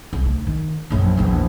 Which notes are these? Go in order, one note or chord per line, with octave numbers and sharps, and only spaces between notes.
C2
D2
D#3
A#1 F#2
A#1 E2